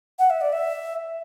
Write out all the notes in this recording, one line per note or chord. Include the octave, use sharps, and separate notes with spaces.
F#5
E5
D5
E5